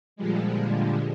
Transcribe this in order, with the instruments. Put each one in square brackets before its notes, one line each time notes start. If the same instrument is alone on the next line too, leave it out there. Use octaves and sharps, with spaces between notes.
[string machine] A#2 D3 F3 G3 G#3